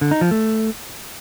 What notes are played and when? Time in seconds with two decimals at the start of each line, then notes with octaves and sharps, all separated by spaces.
0.01 D3
0.11 D#4
0.21 F3
0.31 A3